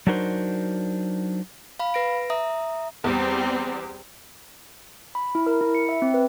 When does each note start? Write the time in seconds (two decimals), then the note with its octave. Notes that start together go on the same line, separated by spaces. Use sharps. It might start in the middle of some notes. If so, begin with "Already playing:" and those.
0.07 F#3 D4 D#4 F#4 A#4 C5
1.79 F5 B5
1.94 B4 A#6 D7
2.30 E5 A#5 D#6
3.04 E2 G3 C4
5.15 B5
5.35 E4
5.46 A#4
5.61 E4
5.75 C#7
5.89 E5
6.02 C4
6.14 B4